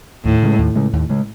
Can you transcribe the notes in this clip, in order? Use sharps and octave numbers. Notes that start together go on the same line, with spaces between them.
D#2 A2
C#3 G#3
D#2
C#3 G#3
D#2
C#3 G#3